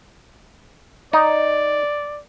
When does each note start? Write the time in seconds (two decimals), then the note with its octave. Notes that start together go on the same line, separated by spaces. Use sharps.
1.13 D#4 D5